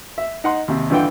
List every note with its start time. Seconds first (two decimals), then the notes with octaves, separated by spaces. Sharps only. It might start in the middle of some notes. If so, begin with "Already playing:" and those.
0.18 E5
0.44 D#4 F#5 C6
0.68 D#2 C3
0.90 G2 D3 E3 F4 F#5 G5